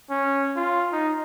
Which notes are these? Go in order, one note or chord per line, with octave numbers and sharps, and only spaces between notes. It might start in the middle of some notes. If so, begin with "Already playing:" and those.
C#4
F4
D#4